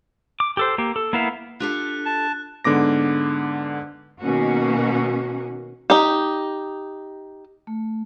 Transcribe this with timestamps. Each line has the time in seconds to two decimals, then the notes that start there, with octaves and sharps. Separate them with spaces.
0.40 D6
0.57 G4 A4 C5
0.78 A#3 G4
0.96 A4
1.13 A#3 B3 E4 E5 F5
1.60 D4 F4 G4 A4 F#6
2.05 A5
2.64 G#2 D3 B3 D6 A#6
4.21 B2 D#3 A#3 C#4 F#4
5.90 D#4 G4
7.67 A3